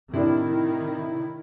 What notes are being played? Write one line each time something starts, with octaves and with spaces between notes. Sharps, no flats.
A2 C3 D#3 D4 E4